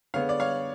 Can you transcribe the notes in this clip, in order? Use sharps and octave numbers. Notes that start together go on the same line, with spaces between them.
D3 G#3 B3 C#5 F5
D5
C#5 F5